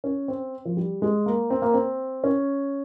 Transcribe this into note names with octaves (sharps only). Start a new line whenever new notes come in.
C#4
C4
F3
G3
G#3
A#3
C4
A#3
C4
C#4